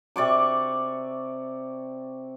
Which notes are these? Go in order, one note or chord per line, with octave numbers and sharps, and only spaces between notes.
C3 D5 C#6 D6